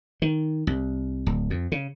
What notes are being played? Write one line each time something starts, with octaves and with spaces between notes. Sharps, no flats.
D#3
C2
D1
F2
C#3